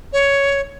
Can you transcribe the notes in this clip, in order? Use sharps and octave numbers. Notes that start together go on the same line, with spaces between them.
C#5